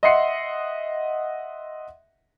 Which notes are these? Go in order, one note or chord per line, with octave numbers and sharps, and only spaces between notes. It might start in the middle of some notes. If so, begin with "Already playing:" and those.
D#5 E5 F#5 C6 C7 C#7